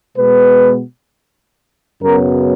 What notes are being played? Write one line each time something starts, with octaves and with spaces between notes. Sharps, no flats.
B2 G#3 B3 B4
F#2 C#3 F#3 B3 A#4